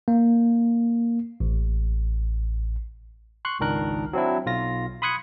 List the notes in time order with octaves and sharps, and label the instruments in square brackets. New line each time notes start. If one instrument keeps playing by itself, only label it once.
[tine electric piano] A#3
A1
C6 C#6 F#6
G#1 C#2 D#3 D4 A#4 F#6
F#3 C4 D4 E4
B1 F4 A#6
B5 C6 D#6 F#6 G#6 C#7